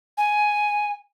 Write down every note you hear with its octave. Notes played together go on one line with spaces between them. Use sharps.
G#5